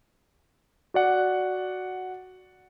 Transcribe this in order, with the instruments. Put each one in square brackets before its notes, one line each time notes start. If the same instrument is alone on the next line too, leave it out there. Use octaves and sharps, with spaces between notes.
[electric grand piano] F#4 D5 F#5